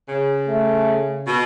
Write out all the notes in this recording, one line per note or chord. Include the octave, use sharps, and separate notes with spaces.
C#3
A3
B2